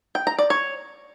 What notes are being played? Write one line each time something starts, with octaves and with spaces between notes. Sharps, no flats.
G5
A#5
D5
C#5